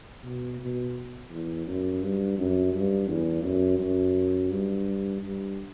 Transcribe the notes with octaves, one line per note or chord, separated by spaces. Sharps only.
B2
B2
E2
F#2
G2
F#2
G2
E2
F#2
F#2
G2
G2